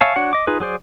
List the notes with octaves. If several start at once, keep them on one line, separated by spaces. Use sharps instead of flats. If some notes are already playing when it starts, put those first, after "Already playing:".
C#5 E5 F5 G#5 A5
D4 F#4 C#5 F#5
D#5 D6
D#4 F4 G#4 B4
F#3 G#4 C5 D5